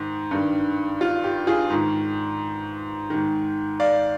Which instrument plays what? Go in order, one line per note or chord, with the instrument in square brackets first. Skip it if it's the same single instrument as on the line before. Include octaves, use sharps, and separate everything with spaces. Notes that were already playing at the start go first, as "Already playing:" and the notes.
Already playing: [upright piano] G#2 D#3
G2 D#3
F4
G4
F4 G#4
G#2 D#3
G#2 D#3
D5 F5